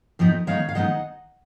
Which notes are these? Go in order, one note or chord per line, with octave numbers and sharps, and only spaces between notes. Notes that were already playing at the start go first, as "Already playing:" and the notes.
F2 F3 B3 D#4
D#3 G#3 B3 D#4 C#5 F5
F5
D#3 G#3 B3 D#4 D#5 F#5